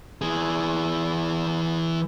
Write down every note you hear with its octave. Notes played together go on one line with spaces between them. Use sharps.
E3 G#4